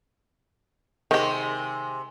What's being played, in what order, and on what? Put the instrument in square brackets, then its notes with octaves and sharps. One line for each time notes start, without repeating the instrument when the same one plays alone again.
[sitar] C3 G#3 [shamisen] D#3 G4